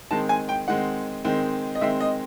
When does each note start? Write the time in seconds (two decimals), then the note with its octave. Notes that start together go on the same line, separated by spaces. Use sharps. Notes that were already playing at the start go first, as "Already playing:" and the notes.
0.11 D#3 G#3 C4 A5
0.29 G#5
0.49 G5
0.68 D#3 G#3 C4 F#5
1.25 D#3 G#3 C4
1.75 D#5
1.81 D#3 G#3 C4 E5
2.00 D#5